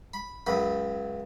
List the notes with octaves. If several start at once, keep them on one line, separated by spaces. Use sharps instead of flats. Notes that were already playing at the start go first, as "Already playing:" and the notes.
B5
C#2 F#2 B5